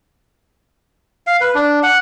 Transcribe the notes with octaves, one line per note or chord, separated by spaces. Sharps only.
F5
B4
D4
F#5